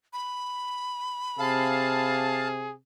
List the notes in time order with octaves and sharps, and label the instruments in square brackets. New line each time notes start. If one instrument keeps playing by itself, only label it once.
[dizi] B5
[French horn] C3 [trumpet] G#4 [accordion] F5 A5